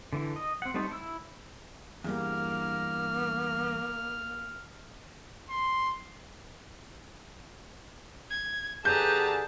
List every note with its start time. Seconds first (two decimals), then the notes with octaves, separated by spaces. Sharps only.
0.13 D3 E3
0.36 D#5
0.62 C4 F#5
0.74 G3 A3 C4 D#4 A4
0.91 E4 E6
2.04 E2 G2 A#3 F6
5.50 C6
8.30 G#6
8.85 D3 G4 G#4 B4 A5 A#5 G6